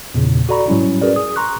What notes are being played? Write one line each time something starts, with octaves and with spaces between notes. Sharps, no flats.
E2 A#2 C#3
F#4 A4 D5 A#5 B5 C#6
G#2 F#3 G3 C#4 E4
C#4 F#4 G#4 A#4 B4 D5
G#4 D#6
A#5 C6 C#6 F#6